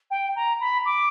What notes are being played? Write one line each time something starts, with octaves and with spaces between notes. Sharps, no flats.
G5
A#5
B5
D6